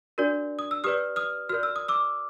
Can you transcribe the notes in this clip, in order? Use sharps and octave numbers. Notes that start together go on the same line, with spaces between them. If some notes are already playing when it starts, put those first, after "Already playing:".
D4 F#4 A#4 D5
D#6
E6
G4 B4 D5 D#6 F6
D#6 F6
F#4 A#4 D5 F6
E6
D#6
D6 E6